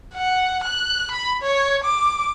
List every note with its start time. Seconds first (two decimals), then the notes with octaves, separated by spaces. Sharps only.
0.15 F#5
0.64 F#6
1.11 B5
1.42 C#5
1.84 D6